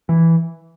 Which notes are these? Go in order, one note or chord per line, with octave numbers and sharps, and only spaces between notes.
E3